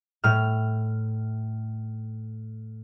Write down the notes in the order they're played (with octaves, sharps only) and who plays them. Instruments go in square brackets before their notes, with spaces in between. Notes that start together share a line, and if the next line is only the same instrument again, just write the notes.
[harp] A2 F6